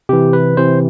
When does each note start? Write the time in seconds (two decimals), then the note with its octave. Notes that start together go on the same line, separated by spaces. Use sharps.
0.09 C3 E3 G4
0.33 B4
0.57 C3 E3 C5